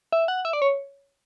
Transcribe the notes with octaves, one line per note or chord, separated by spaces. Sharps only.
E5
F#5
E5
D5
C#5